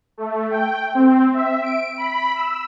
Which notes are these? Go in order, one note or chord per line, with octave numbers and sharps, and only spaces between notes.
A3
G5
C4
E5
D7
B5
E6